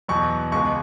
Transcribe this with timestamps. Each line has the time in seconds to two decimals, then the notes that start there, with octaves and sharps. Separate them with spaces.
0.08 E2 B2 F#3 C#6
0.52 C#2 B2 G#3 C#6